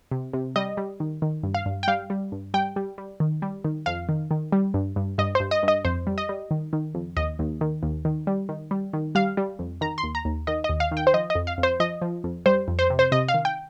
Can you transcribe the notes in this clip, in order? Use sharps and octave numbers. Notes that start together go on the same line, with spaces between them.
C3
C3
G3 D#5
G3
D#3
D#3
G2
F5
G2
G5
G3 F5
G3
G2
G3 G5
G3
G3
D#3
G3
D#3
F2 F5
D#3
D#3
G3
G2
G2
G2 D#5
G2 C5
D#5
G2
D#5
F2 C5
G3
D#5
G3
D#3
D#3
F2
D#2 D#5
D#2
D#3
D#2
D#3
G3
D#3
G3
D#3
G3 F5
G3
F2
D#3 A#5
C6
D#2
A#5
D#2
D#3 D#5
D#5
D#2
F5
D#3
G5
C5
F3 D#5
D#5
F2
F5
F2
C5
F3 D#5
F3
F2
G3 C5
F2
C5
C3
C5
C3 D#5
F5
D#3
G5